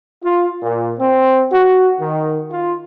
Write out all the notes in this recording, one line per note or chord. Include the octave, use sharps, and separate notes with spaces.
F4
A#2
C4
F#4
D#3
F4